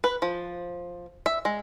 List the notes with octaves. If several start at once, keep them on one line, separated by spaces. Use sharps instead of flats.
B4
F3
E5
G#3